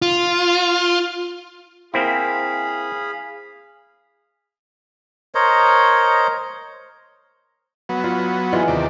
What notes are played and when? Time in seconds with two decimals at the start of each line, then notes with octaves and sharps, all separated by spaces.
0.02 F4
1.94 A#3 C4 E4 G#4 F5 B5
5.35 A#4 C5 C#5 D#5
7.89 F#3 B3
8.04 F4
8.53 E3 G#3 F4
8.68 D#2 C3 D5